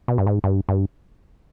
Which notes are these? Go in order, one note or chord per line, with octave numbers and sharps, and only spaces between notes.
B2
G2
G#2
G2
G2